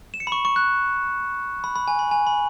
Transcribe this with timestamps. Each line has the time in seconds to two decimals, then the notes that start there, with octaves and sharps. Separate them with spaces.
0.14 E7
0.20 C#7
0.27 B5
0.32 C#6
0.45 C#6
0.56 F#6
1.64 B5
1.76 B5
1.88 G#5
1.99 B5
2.11 G#5
2.27 B5